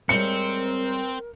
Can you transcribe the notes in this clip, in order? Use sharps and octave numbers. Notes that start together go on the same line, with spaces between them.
A2 G3 G#3 C4 A#4 C#7